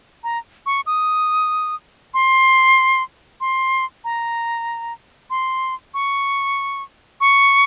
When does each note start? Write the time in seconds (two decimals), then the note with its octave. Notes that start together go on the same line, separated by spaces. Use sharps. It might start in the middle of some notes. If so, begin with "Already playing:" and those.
0.24 A#5
0.66 C#6
0.86 D#6
2.14 C6
3.41 C6
4.04 A#5
5.30 C6
5.94 C#6
7.21 C#6